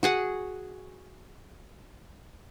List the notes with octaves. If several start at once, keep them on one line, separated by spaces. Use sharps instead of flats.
F#4 G#4 F#5